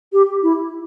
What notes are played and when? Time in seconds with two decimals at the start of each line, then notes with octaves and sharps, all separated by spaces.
0.13 G4
0.43 E4